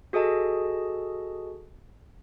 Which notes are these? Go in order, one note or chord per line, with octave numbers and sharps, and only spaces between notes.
F#4 G#4 A4 D#5 A5